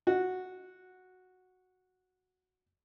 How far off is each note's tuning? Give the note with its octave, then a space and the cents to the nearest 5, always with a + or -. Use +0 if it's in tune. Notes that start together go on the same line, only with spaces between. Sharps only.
F#4 -5